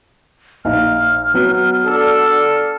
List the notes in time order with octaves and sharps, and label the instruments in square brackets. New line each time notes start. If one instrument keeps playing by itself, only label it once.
[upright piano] A#1 D#4 F5 [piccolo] F6
[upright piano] F#3 B3
[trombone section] D3 D4 A4